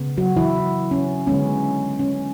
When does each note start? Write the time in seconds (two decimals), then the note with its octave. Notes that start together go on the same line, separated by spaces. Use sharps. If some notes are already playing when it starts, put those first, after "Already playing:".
Already playing: C#3 B3
0.17 F#3 F#4
0.37 E3 E4
0.91 C#4
1.27 D3 G#3 B3 C#4
1.99 C#4